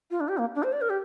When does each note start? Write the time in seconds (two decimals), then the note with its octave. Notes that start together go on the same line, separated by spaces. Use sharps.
0.11 F4
0.20 D4
0.28 G4
0.38 A#3
0.55 D4
0.63 C5
0.72 D5
0.81 A#4
0.90 G4